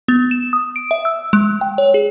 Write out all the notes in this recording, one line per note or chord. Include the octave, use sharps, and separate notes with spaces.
B3
E7
D#6
D7
E5
E6
G#3
G5
C#5
G#4